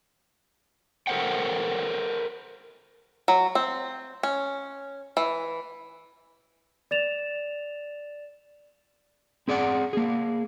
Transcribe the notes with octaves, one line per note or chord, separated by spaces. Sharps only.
A4 A#4 C5 F#5 G5
F#3
C4
C#4
E3
D5 A6 E7 F7
C4 G#4 D5 E5 F#5
A#3 G#4